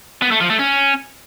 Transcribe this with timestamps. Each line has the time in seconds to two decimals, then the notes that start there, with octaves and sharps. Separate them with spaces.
0.22 B3
0.31 A3
0.40 F3
0.50 A3
0.59 C#4